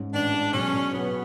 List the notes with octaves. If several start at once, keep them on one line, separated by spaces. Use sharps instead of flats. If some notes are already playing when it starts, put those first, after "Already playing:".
Already playing: G#2 C#4
A1 D4
G#3
B1 C#4
B2
B1 B3